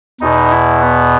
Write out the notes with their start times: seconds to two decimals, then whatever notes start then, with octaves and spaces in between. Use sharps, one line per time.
0.21 E2 B2 D#4
0.51 E4
0.81 B3